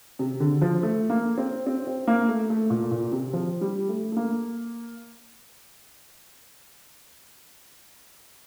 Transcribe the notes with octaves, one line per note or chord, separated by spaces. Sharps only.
C3
D3
F3
A3
A#3
C4
C4
C4
A#3
A3
A3
A#2
A#2
C3
F3
G3
A3
A3
A#3